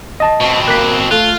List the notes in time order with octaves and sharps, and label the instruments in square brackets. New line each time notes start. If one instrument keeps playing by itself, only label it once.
[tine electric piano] D#5 A5
[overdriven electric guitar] B2 C4
[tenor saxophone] A#3 [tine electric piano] F#6 B6
[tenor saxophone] A3 [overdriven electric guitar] F4 [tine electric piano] F#6